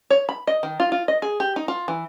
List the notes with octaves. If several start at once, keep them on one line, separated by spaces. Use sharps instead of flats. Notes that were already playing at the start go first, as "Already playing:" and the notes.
C#5
B5
D#5
D#3
F4
F4
D#5
G#4
G4
D#4
F4
E3